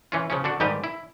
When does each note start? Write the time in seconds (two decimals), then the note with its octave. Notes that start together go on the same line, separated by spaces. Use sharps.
0.12 E3 C#4 F4
0.30 C#3 F3 C#4
0.44 D3 D4 F#4
0.60 G#2 D#3 G3 G4 B4
0.84 E4